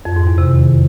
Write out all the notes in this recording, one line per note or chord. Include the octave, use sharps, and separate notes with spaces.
F2
G#2
E2
C3
D#3